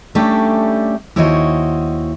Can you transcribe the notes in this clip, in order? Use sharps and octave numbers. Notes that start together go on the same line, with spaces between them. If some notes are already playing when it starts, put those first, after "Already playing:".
G3 A3 C#4 D4 G4
D#2 E4 F#4 C5 C#5 D#5